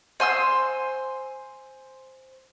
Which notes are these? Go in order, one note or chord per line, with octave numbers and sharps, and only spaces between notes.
C5 G#5 C6 E6